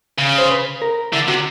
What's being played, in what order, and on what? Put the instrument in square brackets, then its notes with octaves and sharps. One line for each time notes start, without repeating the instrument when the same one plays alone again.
[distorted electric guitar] C#3
[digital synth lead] C5
B4
A#4
[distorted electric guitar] D3 [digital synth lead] E4
[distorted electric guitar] C3 [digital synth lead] F#4